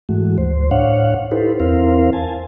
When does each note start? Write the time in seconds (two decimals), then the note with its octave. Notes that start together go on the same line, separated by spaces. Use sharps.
0.09 G#2 E3 G#3 A3 F#4
0.38 D2 C5
0.71 A2 D4 C#5 F5 F#5
1.31 D#4 E4 G4 A4 B4 C5
1.60 E2 C4 E4 A#4 C5 F5
2.13 G#5 A5